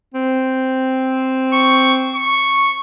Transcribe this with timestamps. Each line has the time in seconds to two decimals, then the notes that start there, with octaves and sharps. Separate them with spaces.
0.14 C4
1.52 C#6
2.15 C#6